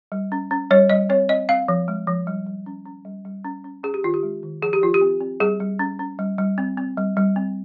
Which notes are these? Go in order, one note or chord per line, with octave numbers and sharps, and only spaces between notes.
G3
C#4
C#4
G3 C#5
G3 D#5
C4 C#5
C4 D#5
C4 F5
F3
G#3
F3
G3
G3
C#4
C#4
G3
G3
C#4
C#4
C#4 G#4
G4
D#3 F4
G4
G#3
D#3
F3 G#4
G4
F3 F4
G4
C4
C4
G3 G#4
G3
C#4
C#4
G3
G3
C4
C4
G3
G3
C4